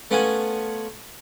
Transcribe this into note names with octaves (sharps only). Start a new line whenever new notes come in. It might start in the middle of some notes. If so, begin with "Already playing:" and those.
A3 B3 C#4 F4 F#5 G#5